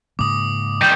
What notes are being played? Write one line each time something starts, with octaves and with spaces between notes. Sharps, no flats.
G#2 C#3 A#3 D6 D#6
D#3 G3 G5